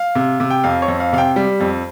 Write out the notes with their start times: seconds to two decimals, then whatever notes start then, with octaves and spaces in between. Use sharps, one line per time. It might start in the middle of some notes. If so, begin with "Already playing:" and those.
Already playing: F5
0.15 C3
0.40 C3
0.50 G5
0.64 F2 F5
0.82 C#5
0.88 F2
1.00 F5
1.13 C3 F5
1.18 G5
1.36 G3
1.60 F2